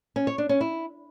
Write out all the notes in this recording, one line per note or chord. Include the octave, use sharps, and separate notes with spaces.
C#4
C#5
D4
C#4
E4